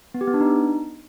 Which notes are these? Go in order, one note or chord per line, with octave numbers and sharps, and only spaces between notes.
B3
G4
B3
D4
D#4